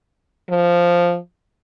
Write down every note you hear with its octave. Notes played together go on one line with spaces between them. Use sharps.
F3